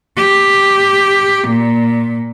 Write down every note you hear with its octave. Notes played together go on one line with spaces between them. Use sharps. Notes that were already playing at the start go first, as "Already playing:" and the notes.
G4
A#2